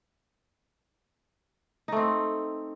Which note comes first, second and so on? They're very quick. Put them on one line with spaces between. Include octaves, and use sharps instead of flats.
D#4 A3 C4